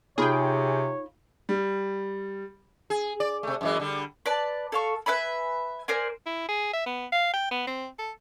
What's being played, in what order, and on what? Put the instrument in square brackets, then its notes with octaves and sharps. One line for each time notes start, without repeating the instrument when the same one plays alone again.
[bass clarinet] C3 [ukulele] D#4 F4 B5 [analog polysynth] G#4 G5 [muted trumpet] C#5
[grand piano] G3
[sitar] G#4
D5
C3 A3
F#2 E3 G#3
D3 G3
[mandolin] B4 D5 A5
A4 F5 C#6
B4 E5 G#5 B5
A#4 C5 D5 G#5
[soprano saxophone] E4
G#4
E5
B3
F5
G5
B3
C4
A4